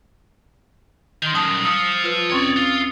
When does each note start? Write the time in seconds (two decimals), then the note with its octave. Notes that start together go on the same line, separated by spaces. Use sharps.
1.22 D#3 C6 G6 F7
1.34 F#2 D#3 G3 A5 D#6
1.65 F3 D#6 E6 C#7
2.04 F4 B4
2.31 D#2 C4 C#4 C#5 D5
2.57 F4 F7